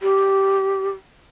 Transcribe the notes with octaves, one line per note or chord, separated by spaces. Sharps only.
G4